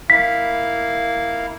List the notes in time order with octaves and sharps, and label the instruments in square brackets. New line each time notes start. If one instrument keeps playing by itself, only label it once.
[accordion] A#3 E4 F5 [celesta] B6